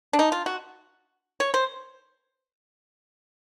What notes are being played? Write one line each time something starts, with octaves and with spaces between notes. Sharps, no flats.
D4
D#4
F4
F#4
C#5
C5